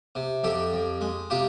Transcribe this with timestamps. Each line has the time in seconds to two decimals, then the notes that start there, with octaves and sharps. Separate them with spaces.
0.15 C3
0.43 F2 G4 A4
0.73 F2
1.01 G#3
1.30 C3 F4 G4